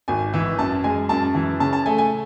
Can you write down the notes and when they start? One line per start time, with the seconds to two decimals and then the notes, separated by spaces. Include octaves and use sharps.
0.08 G#1 G#5
0.34 E3
0.59 F#2 A5
0.84 G#3 G#5
1.09 F#2 A5
1.35 E3
1.60 C#3 A5
1.73 A5
1.86 A3 G#5
1.98 G#5